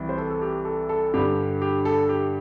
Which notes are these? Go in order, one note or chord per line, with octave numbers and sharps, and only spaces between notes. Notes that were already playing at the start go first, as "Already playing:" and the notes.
Already playing: C2 E3
C5
A4
A4
G4
A4
A4
G2 D3 G4
G4
A4
G4